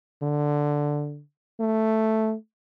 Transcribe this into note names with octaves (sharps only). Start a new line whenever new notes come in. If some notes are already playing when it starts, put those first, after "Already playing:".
D3
A3